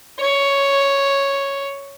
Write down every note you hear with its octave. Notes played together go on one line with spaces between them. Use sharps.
C#5